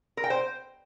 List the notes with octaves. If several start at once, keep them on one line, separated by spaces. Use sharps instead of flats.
A#4
G5
C5